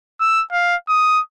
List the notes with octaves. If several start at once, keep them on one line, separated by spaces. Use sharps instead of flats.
E6
F5
D#6